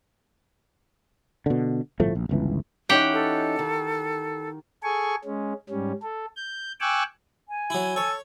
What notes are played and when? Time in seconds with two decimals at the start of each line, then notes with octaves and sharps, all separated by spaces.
1.46 B2 D3
2.00 G1 A2 F3 A3
2.15 A#1
2.29 G1 C#2 E3
2.89 E3 C#4 D#4 G4 F#5 G5
3.13 A4
3.59 D#3
4.83 G#4 A4 G#5 C#6
5.24 G#3 C#4
5.70 G#2 G3 C#4
6.02 A4
6.36 G6
6.80 G5 G#5 C#6 D6 E6 F#6
7.48 G#5
7.70 F#3 E4
7.96 A4 C#5